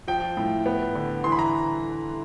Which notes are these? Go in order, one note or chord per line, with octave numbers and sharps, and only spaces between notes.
F3 G5
A2
B3
D3
E3 C6
B5
A#5